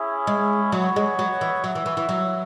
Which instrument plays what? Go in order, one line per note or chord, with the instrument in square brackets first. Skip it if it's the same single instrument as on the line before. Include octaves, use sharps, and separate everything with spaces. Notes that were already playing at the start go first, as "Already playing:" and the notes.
Already playing: [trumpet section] C#4 E4 G#4
[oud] G#3
[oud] F#3 [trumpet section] B3 F#4 C#5
[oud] G#3
F#3
E3
[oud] F#3 [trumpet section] F#4 E5
[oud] E3
E3
E3
F#3